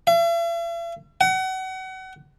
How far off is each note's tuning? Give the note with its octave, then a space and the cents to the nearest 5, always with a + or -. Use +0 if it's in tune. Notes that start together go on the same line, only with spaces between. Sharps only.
E5 +45
F#5 +30